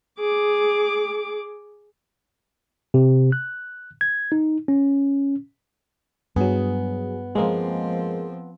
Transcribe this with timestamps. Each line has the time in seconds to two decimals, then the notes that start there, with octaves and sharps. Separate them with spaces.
0.19 G#4 D6
2.94 C3
3.32 F#6
4.01 G#6
4.32 D#4
4.68 C#4
6.36 G2 F#3 B3 G#4
7.35 F3 G#3 A#3 C4